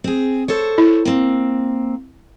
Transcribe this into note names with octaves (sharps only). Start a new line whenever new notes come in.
C4 G#4
A4 C5 C#5
E4
A#3 C4